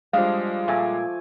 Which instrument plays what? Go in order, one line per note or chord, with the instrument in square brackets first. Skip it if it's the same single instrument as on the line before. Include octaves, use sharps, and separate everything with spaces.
[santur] F3 D#5 [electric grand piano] G3 G#3 [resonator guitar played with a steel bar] D4 F5
[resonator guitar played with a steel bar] A#2 [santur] A3 G#5 D6